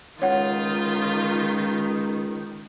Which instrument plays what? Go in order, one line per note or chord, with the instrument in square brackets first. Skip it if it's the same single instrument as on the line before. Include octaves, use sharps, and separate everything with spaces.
[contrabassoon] C#2 [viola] D#3 [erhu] F4 [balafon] C#5 F#5